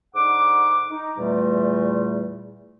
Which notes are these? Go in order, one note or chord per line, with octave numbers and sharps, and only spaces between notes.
G#2 D3 D#4 F#5 D6
D#4
E2 A#2 G3 A3